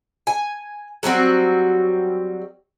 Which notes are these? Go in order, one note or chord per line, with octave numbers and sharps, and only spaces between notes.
G#5
F#3 G3 C4 F#4